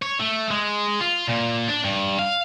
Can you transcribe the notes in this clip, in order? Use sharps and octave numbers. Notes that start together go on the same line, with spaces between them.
C#5
A3
G#3
F4
A#2
D4
G2
F5